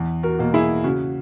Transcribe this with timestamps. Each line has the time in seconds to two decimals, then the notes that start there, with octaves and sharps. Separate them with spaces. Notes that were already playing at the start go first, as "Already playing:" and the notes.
Already playing: E2
0.23 F#4 A#4
0.39 B2 A#3
0.54 E4 G#4
0.84 C#3 F#4